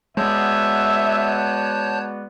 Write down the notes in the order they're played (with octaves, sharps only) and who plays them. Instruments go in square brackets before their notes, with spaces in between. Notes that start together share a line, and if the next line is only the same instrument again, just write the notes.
[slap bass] G#3 [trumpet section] B3 F#4 D5 [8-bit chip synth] C#5 A5 G6 [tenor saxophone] E5